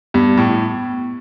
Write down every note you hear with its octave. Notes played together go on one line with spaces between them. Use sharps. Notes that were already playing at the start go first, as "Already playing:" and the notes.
G2 B3
A2